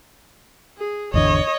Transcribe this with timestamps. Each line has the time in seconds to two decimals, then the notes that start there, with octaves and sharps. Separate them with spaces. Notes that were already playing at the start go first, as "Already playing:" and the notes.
0.78 G#4
1.14 G#1 E2 D3 C#5 D#5